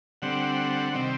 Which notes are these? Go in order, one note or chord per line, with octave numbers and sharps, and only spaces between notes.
D3 G3 C4 F#5
C3 D#3 G3 C4